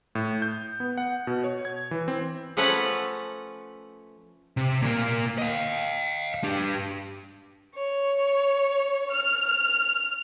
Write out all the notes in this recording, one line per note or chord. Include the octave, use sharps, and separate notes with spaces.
A2
G6
B3
F#5
B2
C#5
G#6
E3
C4
F3 A3 C#4 B4 F#5
C3
A#2 A#3
D#5 F5
D4 G4
C#5
F6